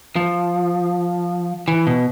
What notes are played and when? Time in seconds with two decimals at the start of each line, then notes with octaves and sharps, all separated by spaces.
0.16 F3
1.68 E3
1.87 B2